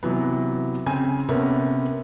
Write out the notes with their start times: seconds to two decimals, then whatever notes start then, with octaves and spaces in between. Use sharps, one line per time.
0.03 C3 E3 F#3 B3
0.86 C#3 C4 G#5
1.29 C3 A#3 B3 C#4 A4 A#4